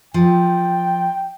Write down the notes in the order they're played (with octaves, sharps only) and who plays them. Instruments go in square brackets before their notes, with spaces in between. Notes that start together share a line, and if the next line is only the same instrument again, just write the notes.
[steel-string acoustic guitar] F3 [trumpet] G5